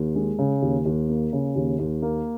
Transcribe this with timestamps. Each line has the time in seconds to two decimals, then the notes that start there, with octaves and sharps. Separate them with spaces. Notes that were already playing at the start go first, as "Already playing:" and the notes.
Already playing: D#2
0.15 G#3
0.39 C#3
0.62 D#2
0.86 D#2
1.09 A#3
1.33 C#3
1.56 D#2
1.79 D#2
2.02 A#3